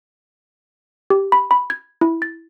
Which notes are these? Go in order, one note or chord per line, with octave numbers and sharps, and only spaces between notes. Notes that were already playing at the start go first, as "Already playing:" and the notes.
G4
B5
B5
G#6
E4
A6